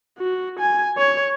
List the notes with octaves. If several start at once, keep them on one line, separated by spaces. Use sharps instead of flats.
F#4
G#5
C#5